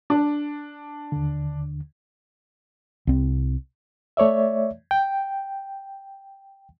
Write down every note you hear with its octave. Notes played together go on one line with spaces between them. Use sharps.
D4
D#2 D3
C2 C4
A3 C#5 D5 E5
G5